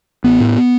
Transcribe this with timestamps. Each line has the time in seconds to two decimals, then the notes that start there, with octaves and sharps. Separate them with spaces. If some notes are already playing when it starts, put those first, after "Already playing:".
0.24 A1 B3
0.40 A2